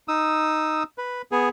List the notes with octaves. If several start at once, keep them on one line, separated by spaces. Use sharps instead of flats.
D#4 D#6 E6
B4
B3 G#4